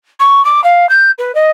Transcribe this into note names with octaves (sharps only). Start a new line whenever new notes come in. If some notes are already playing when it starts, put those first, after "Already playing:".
C#6
D6
F5
G6
B4
D#5